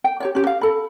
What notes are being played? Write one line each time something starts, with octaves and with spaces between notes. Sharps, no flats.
G5
G4 C#5 D5
C#4 G4
F5
A4 B5